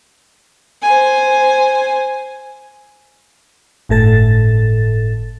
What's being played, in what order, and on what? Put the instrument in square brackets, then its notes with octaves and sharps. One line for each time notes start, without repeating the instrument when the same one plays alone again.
[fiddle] C5 G#5
[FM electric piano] G1 A2 A4 A6